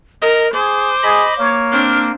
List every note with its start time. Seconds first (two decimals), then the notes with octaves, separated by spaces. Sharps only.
0.22 A#4 D#5
0.54 G#4 C5 D6
1.03 G#4 D#5 B5
1.39 A#3 C#5
1.72 C4 D4 F6